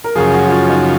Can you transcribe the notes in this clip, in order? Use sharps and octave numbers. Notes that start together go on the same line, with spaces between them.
A#4
F#2 C#3 F3 G#4
F#4
F#4
F4
D#4